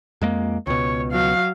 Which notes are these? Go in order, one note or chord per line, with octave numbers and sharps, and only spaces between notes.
F2 G#3 A#3
C#2 B2 C#5
F#3 F5